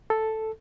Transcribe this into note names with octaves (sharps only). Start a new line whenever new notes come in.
A4